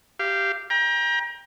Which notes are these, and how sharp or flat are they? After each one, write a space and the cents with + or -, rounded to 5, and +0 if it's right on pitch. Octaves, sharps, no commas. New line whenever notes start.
G4 +0 F5 -20
G5 +25 A#5 +30